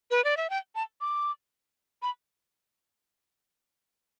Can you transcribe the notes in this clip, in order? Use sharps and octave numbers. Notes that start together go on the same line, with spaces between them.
B4
D5
E5
G5
A5
D6
B5